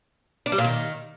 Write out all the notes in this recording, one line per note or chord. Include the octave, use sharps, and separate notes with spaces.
D4
G3
A#2
D#3